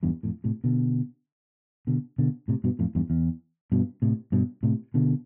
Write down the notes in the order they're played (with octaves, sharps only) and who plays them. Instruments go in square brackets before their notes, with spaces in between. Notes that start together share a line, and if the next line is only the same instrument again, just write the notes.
[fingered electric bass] E2 G2
F2 A2
A2 C3
B2 D3
B2 D3
B2 D3
A2 C3
G2 B2
F2 A2
E2 G2
E2
G2 B2
A2 C3
G2 B2
A2 C3
B2 D3